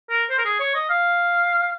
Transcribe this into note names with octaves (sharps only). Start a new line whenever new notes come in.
A#4
C5
A#4
G#4
C#5
D#5
F5